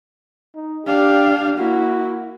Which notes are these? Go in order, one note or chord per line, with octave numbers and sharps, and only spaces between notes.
D#4
D4 G4 F5
A#3 E4 F#4